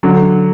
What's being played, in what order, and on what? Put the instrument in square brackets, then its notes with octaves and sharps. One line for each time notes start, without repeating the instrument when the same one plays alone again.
[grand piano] D3 F#3 D4